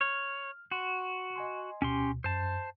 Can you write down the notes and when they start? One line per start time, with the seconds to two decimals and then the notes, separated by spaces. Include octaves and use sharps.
0.01 C#5 F6
0.71 F#4 C6
1.36 D#5 G#5 C6
1.82 D2 B2 C#4 G4 C6
2.24 F#2 C5 A5